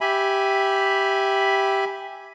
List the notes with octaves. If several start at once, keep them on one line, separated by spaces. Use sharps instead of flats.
G4 E5 G#5 B5